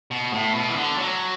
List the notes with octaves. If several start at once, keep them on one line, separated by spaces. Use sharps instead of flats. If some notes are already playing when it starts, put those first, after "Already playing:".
B2
A2
B2
E3
D3
F#3